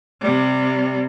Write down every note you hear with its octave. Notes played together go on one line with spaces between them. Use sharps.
C3 G3